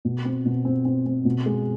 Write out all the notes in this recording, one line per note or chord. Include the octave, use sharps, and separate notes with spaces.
B2
C4
B2
C4
C4
C4
B2
G#3